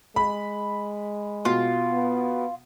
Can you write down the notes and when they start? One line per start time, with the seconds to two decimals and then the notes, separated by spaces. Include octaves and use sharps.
0.16 G#3 B5
1.45 B2 F4
1.93 B3